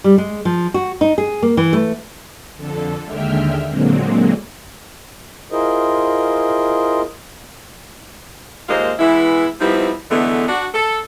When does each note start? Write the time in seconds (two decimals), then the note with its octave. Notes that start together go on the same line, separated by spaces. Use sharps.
0.04 G3
0.18 G#3
0.45 F3
0.74 F#4
1.01 D#4
1.18 G#4
1.42 A#3
1.57 E3
1.73 A3
2.57 F2 D3 A4
3.04 D#2 D3 G#3 E5 G5 F6
3.68 A#2 D3 F#3 G#3 A#3 C4
5.52 E4 F4 G#4 A#4 C5 D#5
8.69 D#2 G#3 A#3 F4 C5 D#5
8.99 E3 G#3 B3 E4
9.60 F3 G3 B3 C4 D#4 E4
10.11 D3 E3 G#3 A3 B3
10.48 D4 F#4
10.74 A4